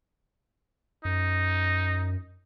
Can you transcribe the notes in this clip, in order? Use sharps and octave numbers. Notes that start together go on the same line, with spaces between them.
F#2 D#4